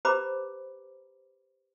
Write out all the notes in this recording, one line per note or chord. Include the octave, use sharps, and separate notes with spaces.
G4 B4 C5 A#5 B5 D6